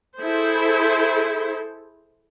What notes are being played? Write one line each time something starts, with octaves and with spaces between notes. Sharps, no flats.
E4 G#4 A4 C5